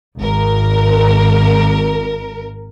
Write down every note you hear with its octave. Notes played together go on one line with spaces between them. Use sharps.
G#1 A#4